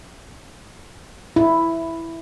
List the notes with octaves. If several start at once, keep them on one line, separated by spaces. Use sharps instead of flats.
E4